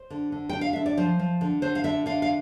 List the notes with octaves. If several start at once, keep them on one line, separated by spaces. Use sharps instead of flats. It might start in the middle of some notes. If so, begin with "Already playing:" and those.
Already playing: C5
D3
D3
D3 G5
F5
D3 E5
D5
F3 C5
F3
D3
D3 C5
F5
D3 E5
D3 F5
F5